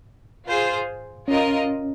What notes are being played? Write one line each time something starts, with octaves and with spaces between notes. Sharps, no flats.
F4 G#4 C5
C#4 F4 A#4 D#5